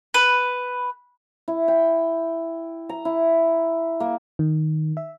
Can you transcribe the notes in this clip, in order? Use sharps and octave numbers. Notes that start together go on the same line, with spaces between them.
B4
E4
G5
A#5
E4
A#3
D#3
E5